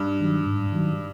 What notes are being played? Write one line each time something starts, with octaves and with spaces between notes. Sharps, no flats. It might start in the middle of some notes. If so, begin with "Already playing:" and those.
Already playing: G2
D#3 F#3
G#2
D#3 F#3